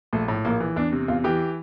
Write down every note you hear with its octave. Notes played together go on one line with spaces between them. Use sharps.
A#1 A3
A2
A#1 A#3
E3
E2 D4
C3
E2 F4
E3 G4